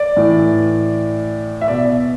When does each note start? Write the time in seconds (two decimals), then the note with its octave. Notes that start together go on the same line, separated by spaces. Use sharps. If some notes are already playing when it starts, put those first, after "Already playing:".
Already playing: D5
0.17 A2 E3
1.61 E5
1.68 B2 D5